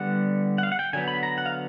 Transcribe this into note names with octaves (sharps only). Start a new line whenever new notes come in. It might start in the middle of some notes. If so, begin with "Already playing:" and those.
Already playing: D3 G3 B3 F#5
F#5
F5
F#5
G5
D3 F#3 B3 G#5
B5
A#5
F#5
F5